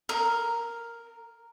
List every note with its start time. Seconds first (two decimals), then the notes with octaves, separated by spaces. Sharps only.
0.09 A#4